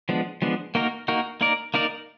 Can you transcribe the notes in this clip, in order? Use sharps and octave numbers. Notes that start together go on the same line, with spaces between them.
F3 G#3 B3 D4
F3 G#3 B3 D4
A#3 D#4 F#4 A#4
A#3 D#4 F#4 A#4
A#3 D#4 A#4 D5
A#3 D#4 A#4 D5